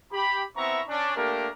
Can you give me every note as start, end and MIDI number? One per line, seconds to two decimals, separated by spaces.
0.12 0.42 67
0.12 0.42 83
0.57 0.80 59
0.57 0.80 60
0.57 0.80 64
0.57 0.80 76
0.57 0.80 82
0.57 0.80 85
0.88 1.12 61
0.88 1.12 62
1.16 1.48 57
1.16 1.48 58
1.16 1.48 62
1.16 1.48 67
1.16 1.48 70